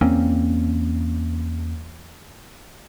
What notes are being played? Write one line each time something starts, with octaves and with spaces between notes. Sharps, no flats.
E2 A#3 C4 C#4